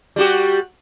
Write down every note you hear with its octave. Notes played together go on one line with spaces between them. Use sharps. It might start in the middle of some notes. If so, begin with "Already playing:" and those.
G3 F#4 G4